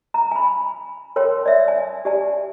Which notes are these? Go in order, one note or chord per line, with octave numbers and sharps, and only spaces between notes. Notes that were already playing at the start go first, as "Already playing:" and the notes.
A#5
G#5 B5
A#4 C#5 G5 C6
D5 E5
G#5
G4 D5 G#5